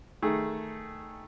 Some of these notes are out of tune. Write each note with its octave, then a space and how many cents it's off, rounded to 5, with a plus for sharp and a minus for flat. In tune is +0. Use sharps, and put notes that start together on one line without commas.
D#3 +0 A3 +0 G#4 +0